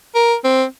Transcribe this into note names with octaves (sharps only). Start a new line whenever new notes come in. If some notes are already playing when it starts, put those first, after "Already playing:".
A#4
C4